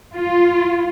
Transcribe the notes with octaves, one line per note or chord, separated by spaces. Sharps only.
F4